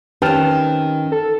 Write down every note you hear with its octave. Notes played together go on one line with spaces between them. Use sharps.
D#3 C4 C#4 G4 B4 G5 A5 F6
A4